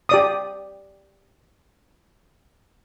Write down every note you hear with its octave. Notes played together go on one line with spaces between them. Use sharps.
G4 D5 D#6